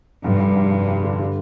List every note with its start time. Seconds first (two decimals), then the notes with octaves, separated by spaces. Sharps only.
0.24 F1 G2
0.40 F1
0.56 F1
0.72 F1
0.88 F1
1.04 D3
1.19 G3